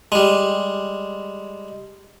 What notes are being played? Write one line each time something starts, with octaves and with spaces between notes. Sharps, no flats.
G3 G#3